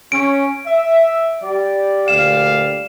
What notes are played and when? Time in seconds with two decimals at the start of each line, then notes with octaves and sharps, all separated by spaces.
0.12 C#4 D7
0.65 E5
1.42 G3 D5
2.08 D2 A#2 F5 E7